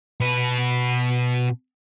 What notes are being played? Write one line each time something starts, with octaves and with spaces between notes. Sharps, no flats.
B2 B4